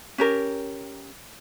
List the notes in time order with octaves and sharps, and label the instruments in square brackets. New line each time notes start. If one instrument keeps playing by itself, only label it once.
[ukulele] C#4 G4 A#4